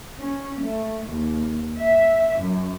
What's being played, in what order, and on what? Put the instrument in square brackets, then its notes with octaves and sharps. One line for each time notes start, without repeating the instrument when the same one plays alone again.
[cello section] C#4
A3
D#2
E5
F#2